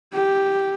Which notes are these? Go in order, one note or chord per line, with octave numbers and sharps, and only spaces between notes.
G4